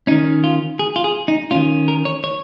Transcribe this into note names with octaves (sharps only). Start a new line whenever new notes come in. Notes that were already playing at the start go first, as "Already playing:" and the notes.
D#3 C#4 D#4
F4
G#4
F4
G#4
D#4
D#3 C#4 F4
A#4
C#5
C#5